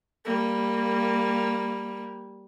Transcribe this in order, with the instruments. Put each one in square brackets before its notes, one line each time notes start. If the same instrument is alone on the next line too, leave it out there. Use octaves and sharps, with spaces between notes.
[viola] G3 A#3